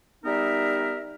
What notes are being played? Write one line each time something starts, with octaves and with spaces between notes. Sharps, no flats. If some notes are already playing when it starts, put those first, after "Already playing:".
G3 B3 D#4 A#4 E5